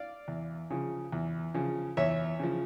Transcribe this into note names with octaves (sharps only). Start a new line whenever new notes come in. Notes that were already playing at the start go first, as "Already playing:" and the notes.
Already playing: D5 F5
E2
C#3 F3
E2
C#3 F3
E2 C#5 E5
C#3 F3